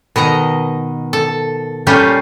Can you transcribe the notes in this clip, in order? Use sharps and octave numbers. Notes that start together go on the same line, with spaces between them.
B2 D#3 D#5 A#5
A4
A#2 G3 A3 C#4 F4 F5